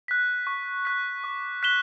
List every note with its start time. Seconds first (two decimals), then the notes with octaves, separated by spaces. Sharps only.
0.08 F#6 B6
0.47 C#6
0.85 F#6 B6
1.24 D6
1.63 F#6 B6 E7 G7